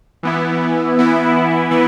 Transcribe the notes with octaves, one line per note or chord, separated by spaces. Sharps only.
E3 B3 E4
E3 B3 E4
E3 B3 E4